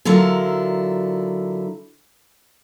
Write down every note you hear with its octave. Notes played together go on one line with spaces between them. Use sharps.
D3 F#3 E4 F4 A#4